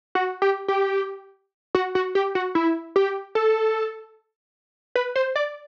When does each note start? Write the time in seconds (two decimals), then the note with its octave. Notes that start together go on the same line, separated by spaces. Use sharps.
0.15 F#4
0.42 G4
0.68 G4
1.75 F#4
1.95 F#4
2.15 G4
2.35 F#4
2.55 E4
2.96 G4
3.35 A4
4.95 B4
5.16 C5
5.36 D5